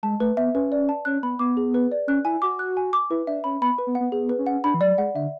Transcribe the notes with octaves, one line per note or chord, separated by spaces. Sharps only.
G#3 A5
A3 B4
B3 E5
C#4 B4
D5
A5
C#4 F#6
B3 B5
B3 D6
G#4
B4
D5
C#4 F#6
E4 G#5
F#4 D6
F#6
G#5
D6
E4 B4
D4 E5
C#4 B5
B3 B5
B4
B3
F#5
B3
B3 G#4
B4
C#4
F#5
D4 B5
E3
F#3 D5
G#3 F#5
D3 E5